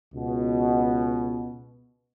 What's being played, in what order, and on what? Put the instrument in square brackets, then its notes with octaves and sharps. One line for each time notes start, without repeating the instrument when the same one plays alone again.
[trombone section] C#2 B2